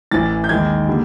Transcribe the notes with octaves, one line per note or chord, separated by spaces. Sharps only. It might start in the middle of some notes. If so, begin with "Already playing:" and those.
A1 A2 E3 A6
G6
D#2 D#3 G#3 G#6
D3 G3 A#3